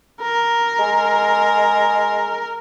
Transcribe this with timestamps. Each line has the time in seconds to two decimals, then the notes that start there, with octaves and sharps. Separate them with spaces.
0.22 A#4
0.79 G#3